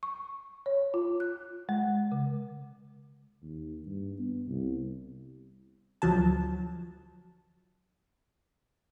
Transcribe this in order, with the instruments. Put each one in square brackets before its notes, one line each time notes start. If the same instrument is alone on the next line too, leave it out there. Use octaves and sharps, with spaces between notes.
[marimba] C#6
C#5
F4
F#6
G#3
C#3
[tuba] D#2
G2
B3
C2
[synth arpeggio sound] D2 F3 F#3 A5